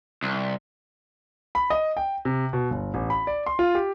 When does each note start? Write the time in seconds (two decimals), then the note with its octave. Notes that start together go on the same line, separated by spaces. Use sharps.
0.23 C2
1.55 B5
1.70 D#5
1.97 G5
2.25 C3
2.53 B2
2.70 G1
2.94 A1
3.10 B5
3.27 D5
3.46 C6
3.59 F4
3.75 G4